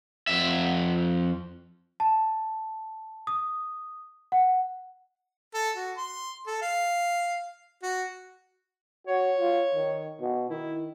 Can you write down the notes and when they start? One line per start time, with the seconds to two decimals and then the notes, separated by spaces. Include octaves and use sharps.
0.27 F2 E5
2.00 A5
3.27 D#6
4.32 F#5
5.54 A4
5.76 F#4
5.97 C6
6.47 A4
6.62 F5
7.83 F#4
9.07 F#4 C#5
9.39 F4
9.75 D#3
10.20 B2
10.50 D#3 E4